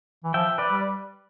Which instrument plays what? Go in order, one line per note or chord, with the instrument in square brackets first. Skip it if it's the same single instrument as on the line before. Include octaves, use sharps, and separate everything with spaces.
[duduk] E3
[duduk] F3 [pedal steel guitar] E5 G5
[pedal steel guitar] B4 D5
[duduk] G3